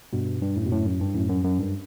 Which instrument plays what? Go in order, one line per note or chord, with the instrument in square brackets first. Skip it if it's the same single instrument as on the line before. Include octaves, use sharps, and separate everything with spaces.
[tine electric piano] G2 B2
G2
F#2 A2
B2
F#2 A2
F#2
G2
F#2 A2
F#2
F#2
G2